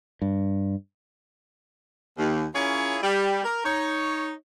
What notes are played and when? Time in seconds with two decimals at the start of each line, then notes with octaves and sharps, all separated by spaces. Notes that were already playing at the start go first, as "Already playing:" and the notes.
0.22 G2
2.18 D#2
2.54 C#4 E4 F4 G#4 A#4 C#5
3.03 G3
3.44 A#4
3.65 D#4 C#5